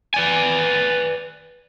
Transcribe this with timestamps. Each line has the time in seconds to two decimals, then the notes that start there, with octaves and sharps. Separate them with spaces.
0.14 B4 D5 G#5